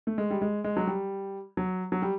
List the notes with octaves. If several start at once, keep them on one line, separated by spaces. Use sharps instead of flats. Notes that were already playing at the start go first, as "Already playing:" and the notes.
A3
G#3
G3
G#3
G#3
F#3
G3
F#3
F#3
G3